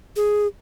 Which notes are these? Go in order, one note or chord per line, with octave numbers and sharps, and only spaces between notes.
G#4